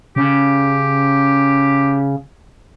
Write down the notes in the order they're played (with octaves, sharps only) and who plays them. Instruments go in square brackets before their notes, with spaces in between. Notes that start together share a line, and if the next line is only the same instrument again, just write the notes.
[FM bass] C#3 [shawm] G4